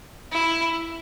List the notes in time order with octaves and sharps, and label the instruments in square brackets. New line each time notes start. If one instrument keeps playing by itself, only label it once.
[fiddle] E4